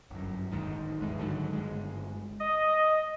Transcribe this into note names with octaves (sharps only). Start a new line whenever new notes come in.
G1 F#2
D1 G#1 G#2 D#3
A1 G2 E3 G#3
G#2 D3 D#3 F#3
G1 G#3
D#5